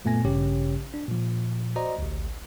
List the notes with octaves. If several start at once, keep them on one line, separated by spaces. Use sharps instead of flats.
F#2 A#2 A3 B3 G#5 A#6
A1 G2 C#3 C#4 G4 C#5
D4
A#2 F3
F#4 C5 D5 D#5 A#5
A1 D2